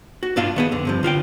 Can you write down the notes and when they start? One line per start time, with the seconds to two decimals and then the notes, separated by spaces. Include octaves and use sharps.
0.23 F#4
0.36 B1 G2 D4 F4 F5
0.56 D#3 B3 G#4
0.72 F2 D3
0.85 G2 C3 F3
1.03 D3 F4 F#5 G5